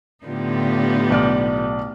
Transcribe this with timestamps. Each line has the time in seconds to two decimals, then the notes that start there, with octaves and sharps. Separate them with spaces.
0.25 A2 D3 B3 D#4 F4 G4
1.11 B1 D5 F6